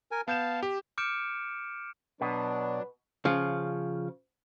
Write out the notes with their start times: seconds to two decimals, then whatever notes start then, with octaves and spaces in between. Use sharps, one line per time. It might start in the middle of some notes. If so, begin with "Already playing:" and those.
0.11 A#4 G#5
0.28 B3 F5 A5 G6 E7
0.63 G4
0.98 D6 F6 G6 C#7 D7 E7
2.21 B2 F#3 D4 B4
3.25 C#3 F3